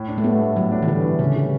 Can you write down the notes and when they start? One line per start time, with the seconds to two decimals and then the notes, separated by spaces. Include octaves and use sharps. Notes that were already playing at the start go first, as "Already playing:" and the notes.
Already playing: A2
0.09 D4
0.18 A3
0.24 G3 B3
0.41 A2
0.56 A2 F#3
0.71 D4
0.82 E3
0.87 D3 G3
1.04 A2
1.19 C#3 C#4
1.36 G3